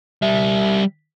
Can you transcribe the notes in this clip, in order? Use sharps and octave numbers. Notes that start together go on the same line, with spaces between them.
G3 E5